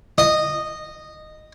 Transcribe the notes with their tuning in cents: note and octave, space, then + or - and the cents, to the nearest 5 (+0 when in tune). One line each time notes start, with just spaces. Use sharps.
D#5 -10